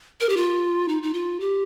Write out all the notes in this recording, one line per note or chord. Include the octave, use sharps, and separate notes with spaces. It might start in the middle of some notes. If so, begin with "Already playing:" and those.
A#4
G4
F4
D#4
D#4
F4
G4